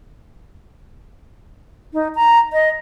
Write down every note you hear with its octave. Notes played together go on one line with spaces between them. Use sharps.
D#4
A#5
D#5